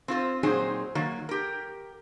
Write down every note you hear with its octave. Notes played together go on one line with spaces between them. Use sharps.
C4 F4 C5
A#2 F#3 C4 D#4 G#4 C5
D#3 F#3 A#3
G4 A#4